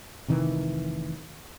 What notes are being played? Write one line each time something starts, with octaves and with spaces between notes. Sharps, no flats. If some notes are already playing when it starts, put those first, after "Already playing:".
F1 C3 D#3 E3